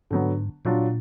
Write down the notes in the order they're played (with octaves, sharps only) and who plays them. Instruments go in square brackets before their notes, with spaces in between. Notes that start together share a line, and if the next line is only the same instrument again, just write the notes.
[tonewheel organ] G#2 [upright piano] D3 F#3 B3
[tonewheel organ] A#2 [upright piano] F#3 D4 F4